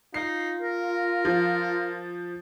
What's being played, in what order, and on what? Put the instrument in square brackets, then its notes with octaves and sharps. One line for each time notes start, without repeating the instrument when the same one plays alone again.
[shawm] D#4 [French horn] F4 [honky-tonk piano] C7
[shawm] A#4
[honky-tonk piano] F3